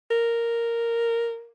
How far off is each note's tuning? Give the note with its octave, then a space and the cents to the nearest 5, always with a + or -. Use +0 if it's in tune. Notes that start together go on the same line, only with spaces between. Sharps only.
A#4 -5